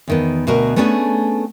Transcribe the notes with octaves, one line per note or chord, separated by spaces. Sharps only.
E2 D#3 B3
D2 B2 F#4 A#4
A3 B3 C#4 D4 G4 G#4